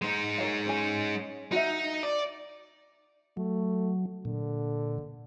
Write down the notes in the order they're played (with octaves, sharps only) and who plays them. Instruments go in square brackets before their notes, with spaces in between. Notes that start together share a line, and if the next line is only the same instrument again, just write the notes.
[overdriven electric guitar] G#3 D#4
[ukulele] A#4 C#5 F5
C#4 C#5 G#5
[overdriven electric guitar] D#4 [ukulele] F#4 E5
[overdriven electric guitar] D5
[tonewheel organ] F#3 [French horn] A3
[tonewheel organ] A#2 [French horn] D3